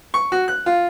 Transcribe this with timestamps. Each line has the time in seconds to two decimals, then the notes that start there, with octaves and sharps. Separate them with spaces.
0.14 C#6
0.32 F#4
0.48 F#6
0.66 F4